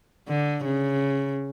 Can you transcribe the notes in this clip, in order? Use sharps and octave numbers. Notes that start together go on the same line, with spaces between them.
D3
C#3